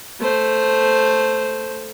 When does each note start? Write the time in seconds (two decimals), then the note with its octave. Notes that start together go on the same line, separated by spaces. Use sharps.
0.20 A3 C5